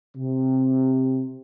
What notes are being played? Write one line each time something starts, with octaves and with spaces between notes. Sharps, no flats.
C3